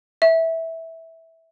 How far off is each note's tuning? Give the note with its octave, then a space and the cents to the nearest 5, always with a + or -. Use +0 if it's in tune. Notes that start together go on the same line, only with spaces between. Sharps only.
E5 -10